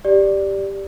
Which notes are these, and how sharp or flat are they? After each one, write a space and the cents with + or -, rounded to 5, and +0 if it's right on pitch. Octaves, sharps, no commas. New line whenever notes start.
G4 +0 D5 +0